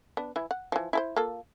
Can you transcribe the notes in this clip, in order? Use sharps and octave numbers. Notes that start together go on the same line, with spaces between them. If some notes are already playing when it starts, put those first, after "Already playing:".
B3 D4
E3 E4
F#5
E3 F3
E4 A4 C5
A#3 F4 A4